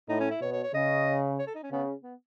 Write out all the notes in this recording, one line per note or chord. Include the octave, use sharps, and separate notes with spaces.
A2 D#4
C#4
E4
B2 C#5
C#5
C#5
C#3 D#5
C#5
A4
D#4
C#4
C#3 B3
B3